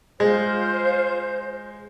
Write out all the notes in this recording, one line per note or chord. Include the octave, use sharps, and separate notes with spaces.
G#3 F4 C5 G6